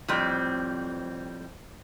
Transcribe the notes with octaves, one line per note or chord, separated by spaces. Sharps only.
F2 A2 G3 C4